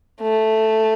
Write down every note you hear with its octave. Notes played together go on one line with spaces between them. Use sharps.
A3